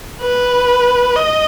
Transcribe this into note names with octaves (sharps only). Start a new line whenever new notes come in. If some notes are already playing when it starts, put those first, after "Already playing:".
B4
D#5